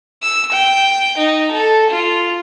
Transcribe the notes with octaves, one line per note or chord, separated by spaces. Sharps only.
E6
G5
D#4
A4
F4